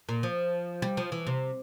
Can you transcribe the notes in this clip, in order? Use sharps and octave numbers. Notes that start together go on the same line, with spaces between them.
A#2
F3
G3
F3
E3
C3